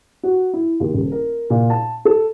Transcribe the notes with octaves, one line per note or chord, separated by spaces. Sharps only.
F#4
E4
D#2
D#1
A#4
A#2
A5
A4